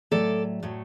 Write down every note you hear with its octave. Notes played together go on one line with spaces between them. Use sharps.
A2 F#3 A3 A4 D5
A2 F#3 A3